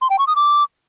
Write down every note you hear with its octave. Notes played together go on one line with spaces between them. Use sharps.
C6
G5
C#6
D#6
D6